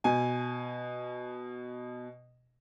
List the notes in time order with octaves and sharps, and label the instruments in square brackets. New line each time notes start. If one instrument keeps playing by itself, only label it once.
[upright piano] B2 G#5